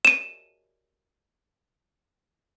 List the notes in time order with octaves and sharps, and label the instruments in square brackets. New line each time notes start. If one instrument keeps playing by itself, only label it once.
[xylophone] D#7 E7